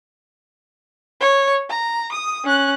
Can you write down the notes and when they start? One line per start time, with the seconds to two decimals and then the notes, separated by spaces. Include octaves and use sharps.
1.21 C#5
1.70 A#5
2.12 D#6
2.45 C#4 F#6